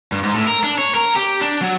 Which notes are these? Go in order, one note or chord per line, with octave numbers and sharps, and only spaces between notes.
G2
G#2
A2
A#4
D4
C#5
A#4
G4
D4
F#3